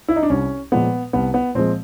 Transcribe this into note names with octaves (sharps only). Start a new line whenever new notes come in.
E4
D#4
D4
C2 C#4
A#2 F3 G#3 B3
C2 B3
B3
A#2 F3 G#3 C4